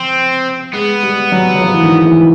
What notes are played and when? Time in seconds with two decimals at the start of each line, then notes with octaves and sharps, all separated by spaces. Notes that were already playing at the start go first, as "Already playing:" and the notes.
Already playing: F3 C4
0.73 G#3 B3
1.03 G3
1.32 F#3
1.56 F#3
1.61 F3
1.74 E3
1.83 D#3
2.06 E3